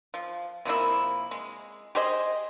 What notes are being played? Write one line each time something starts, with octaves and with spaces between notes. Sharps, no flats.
F3
C3 F3 A#3 E4
G#3
G4 G#4 C5 D#5